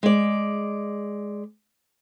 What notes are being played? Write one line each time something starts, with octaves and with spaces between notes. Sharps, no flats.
G#3 D5